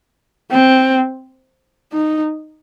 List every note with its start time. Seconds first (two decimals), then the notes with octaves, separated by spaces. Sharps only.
0.51 C4
1.93 D#4